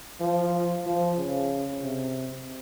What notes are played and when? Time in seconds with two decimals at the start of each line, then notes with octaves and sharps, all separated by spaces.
0.20 F3
0.86 F3
1.17 C#3
1.83 C3